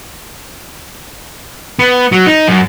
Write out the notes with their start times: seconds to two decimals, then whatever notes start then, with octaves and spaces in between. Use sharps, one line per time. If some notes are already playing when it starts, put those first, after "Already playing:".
1.79 B3
2.12 F#3
2.27 D#4
2.48 F#2